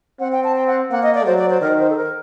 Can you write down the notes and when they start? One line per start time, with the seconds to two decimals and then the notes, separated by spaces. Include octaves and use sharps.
0.20 C4 F#5
0.32 G5
0.44 A5
0.55 G5
0.67 F#5
0.91 A#3 F#5
1.02 D#5
1.14 D5
1.26 F#3 C5
1.38 D5
1.50 C5
1.61 D#3 A#4
1.79 C5
1.90 A4
1.97 A#4